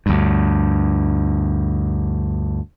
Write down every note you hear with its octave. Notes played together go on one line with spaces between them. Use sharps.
D2 G2